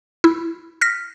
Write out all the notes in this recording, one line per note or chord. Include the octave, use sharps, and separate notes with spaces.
E4
F6 A#6 B6